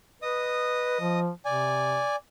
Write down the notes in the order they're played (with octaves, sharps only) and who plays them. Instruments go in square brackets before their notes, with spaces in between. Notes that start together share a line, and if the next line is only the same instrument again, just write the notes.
[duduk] B4 [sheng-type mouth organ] D#5 D#6
[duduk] F3
[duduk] C3 [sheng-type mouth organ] D5 G#5